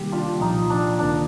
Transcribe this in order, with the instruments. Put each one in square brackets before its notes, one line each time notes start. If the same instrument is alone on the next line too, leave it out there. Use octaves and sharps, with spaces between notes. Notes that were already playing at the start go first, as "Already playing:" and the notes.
Already playing: [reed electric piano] C3 D#3 G3 A#3 [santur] G4
[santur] D4 F4
[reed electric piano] C2 A#2 F3 [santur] D#4
[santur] D4
[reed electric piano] D2 C3 D#3 A#3 [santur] D4